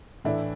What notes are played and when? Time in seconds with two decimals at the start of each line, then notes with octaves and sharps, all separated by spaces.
0.24 A2 E3 A3 D4 E4